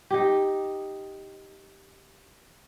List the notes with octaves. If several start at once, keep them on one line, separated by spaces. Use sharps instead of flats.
D#4 G4